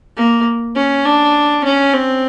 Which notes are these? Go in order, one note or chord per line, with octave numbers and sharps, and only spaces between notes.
A#3
C#4
D4
C#4
C4